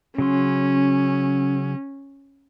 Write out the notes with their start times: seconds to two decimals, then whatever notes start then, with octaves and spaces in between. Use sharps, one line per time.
0.18 C#3 F#3 C#4 C6